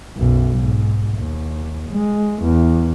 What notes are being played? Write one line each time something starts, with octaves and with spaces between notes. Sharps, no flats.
B1 F#2
G#2
D#2
G#3
E2